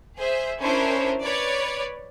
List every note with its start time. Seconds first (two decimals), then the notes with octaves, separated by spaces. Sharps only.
0.17 G#4 C5 E5
0.61 C#4 D4 E4 A#4 C5 C#5
1.23 B4 C#5 D5